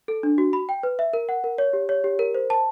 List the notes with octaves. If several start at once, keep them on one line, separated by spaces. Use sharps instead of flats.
A4
D4
F#4
B5
G5
B4
E5
A#4
F#5
A#4
C#5
G4
C#5
G4
A#4
C5
A5